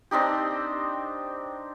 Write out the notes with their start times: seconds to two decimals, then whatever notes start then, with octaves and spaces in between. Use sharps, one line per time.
0.11 C4 D4 D#4 G4